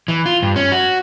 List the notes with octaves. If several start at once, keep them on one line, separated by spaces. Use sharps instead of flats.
E3
F4
G2
C#4
F#4